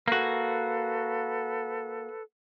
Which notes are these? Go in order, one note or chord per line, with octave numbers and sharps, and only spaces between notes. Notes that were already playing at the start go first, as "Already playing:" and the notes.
A#3 F#4 A4 B4